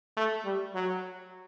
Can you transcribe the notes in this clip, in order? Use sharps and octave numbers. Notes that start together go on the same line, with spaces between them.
A3
G3
F#3